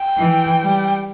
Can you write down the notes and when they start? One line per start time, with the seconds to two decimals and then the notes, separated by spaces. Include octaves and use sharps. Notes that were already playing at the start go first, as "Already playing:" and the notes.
Already playing: G5
0.18 E3
0.61 G3